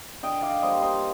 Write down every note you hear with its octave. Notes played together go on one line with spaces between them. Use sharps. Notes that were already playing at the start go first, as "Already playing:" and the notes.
D3 D#5 G5
D5 F5
G3 A#3 C5 D#5
C5 D#5